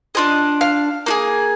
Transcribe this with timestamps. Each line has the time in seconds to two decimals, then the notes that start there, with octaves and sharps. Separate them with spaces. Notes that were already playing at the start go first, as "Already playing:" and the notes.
0.15 D4 F4 G#4 D#5
0.61 F5
1.06 A#3 F4 G#4